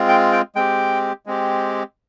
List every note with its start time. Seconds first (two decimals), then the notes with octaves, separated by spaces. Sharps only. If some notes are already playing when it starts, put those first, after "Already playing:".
Already playing: G#3 C4 F4
0.09 G5
0.32 G5
0.56 G#3 C4 G4 G5
1.26 G#3 C4 G4